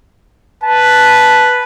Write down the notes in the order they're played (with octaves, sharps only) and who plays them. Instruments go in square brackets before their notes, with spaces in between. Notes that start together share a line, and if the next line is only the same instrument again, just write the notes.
[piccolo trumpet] B4 [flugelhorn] A5